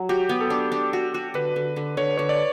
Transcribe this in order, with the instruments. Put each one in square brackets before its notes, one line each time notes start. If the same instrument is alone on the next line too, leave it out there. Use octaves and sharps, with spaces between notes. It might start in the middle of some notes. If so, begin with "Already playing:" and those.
Already playing: [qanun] F#3
[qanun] F#4 [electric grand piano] G4
[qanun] B3
[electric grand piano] A4
[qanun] D4
D4
F#4
F#4
[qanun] D3 [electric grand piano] B4
[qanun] D3
D3
[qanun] D3 [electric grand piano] C#5
[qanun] D3 [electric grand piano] C#5
[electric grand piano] D5